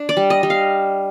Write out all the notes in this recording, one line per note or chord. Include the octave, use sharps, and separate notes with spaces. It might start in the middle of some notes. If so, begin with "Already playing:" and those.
Already playing: D4
D5
G3
D#5
G3
F5